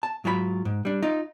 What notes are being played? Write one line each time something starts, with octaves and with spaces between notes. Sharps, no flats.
A5
G#2 F#3 F4 G4 B5
G#2
G3 D4
D#4 F4